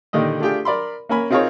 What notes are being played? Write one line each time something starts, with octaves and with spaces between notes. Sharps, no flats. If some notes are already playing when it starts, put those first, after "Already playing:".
A#2 D3 D#3 G4 D#5
A3 D4 F4 G4 G#4 G5
A#4 D5 B5 C6
A#3 C#4 A#4 G#5 B5
C4 D#4 F4 G#4 A#4 C#5